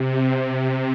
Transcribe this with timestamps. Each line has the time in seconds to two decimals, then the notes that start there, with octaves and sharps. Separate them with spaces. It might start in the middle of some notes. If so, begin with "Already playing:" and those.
Already playing: C3